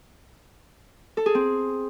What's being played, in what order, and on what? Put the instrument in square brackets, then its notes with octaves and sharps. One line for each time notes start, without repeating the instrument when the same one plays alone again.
[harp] A4
G#4
C4